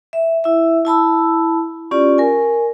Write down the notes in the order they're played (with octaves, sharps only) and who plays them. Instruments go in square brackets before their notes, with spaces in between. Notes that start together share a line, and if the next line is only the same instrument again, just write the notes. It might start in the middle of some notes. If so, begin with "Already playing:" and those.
[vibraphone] E5
E4 E5
E4 A5 B5 E6
C#4 F4 G4 D5
A#4 G#5